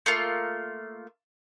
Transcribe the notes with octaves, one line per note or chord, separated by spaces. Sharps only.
A3 A#3 F4